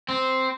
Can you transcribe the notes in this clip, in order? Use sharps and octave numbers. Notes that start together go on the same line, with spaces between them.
C4